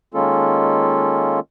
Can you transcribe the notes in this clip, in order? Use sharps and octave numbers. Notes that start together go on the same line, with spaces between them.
D#3 G#3 A#3 C#4 F4 A4